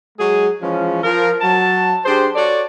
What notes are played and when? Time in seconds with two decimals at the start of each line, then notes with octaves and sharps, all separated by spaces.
0.18 F#3 G#3 G#4
0.62 E3 F3 G#3 C#4
1.04 F3 A#4
1.41 F#3 A5
2.05 D4 G4 G#4 C5
2.35 F#4 A4 C#5 D5